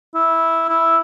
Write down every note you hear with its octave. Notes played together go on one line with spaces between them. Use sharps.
E4
E4